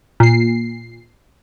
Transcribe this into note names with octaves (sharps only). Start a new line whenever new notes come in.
A#2 C7